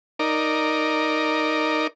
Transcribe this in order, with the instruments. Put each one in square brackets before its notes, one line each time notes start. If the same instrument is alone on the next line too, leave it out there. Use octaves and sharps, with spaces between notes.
[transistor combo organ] D#4 A#4 D5